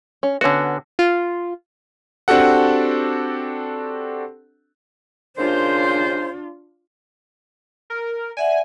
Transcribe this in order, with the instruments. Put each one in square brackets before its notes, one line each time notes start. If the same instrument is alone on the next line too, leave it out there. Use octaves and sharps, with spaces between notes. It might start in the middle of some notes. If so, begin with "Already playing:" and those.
[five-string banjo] C#4
[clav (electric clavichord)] D3 F#4 [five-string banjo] B3 C#4
[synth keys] F4
[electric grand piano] C4 D4 F#4 G4 A4 F#5
[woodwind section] D#2 C#3 C5 [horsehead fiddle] D4 F4
[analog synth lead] A#4
[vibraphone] D5 E5 F#5 [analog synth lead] G#5